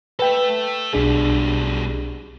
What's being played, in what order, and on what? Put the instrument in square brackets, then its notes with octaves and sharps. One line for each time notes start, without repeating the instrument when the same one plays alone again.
[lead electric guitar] A4 E5 [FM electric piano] B4 G5
[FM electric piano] B1 D4 G#4 [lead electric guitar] B2 G3